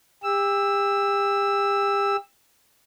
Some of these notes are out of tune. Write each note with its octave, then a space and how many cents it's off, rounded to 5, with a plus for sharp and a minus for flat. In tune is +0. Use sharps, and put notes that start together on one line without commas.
G4 +35 E6 +0